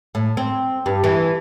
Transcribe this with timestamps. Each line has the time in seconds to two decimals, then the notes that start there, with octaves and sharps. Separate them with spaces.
0.15 A2
0.37 C4
0.86 G2
1.04 E3